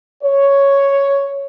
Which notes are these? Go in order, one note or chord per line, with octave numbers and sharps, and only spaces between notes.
C#5